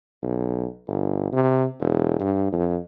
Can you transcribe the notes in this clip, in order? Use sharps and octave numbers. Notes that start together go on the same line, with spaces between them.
B1
G1
C3
E1
G2
F2